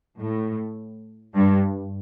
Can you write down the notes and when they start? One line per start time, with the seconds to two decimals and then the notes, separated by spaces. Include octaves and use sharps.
0.19 A2
1.35 G2